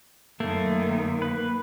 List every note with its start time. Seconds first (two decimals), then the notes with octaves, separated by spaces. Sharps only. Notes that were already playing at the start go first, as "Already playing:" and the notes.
0.40 F#2 D#3 A3 A#3
1.22 B4